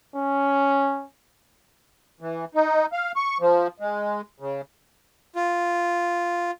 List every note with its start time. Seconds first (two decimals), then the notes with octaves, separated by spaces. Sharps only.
0.16 C#4
2.21 E3
2.55 D#4
2.93 F5
3.16 C#6
3.41 F3
3.80 G#3
4.40 C#3
5.35 F4